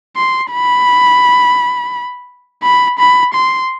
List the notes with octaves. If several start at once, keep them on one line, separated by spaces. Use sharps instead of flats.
C6
B5
B5
B5
C6